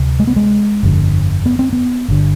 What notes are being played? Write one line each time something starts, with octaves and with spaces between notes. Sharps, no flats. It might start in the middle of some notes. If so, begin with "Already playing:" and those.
Already playing: D2 C3
G#3
B3
G#3
G1 F2 D3
B3
C4
B3
G1 D3